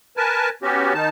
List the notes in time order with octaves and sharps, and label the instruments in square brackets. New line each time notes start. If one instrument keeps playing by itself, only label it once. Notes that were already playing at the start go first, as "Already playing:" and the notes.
[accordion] A#4 B4 G#5 A5
B3 C#4 F#4 G4
D#3 D#4 A5